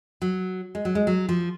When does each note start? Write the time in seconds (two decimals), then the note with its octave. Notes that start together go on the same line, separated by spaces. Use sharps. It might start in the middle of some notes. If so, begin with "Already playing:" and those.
0.22 F#3
0.75 G#3
0.85 F#3
0.95 G#3
1.07 F#3
1.29 F3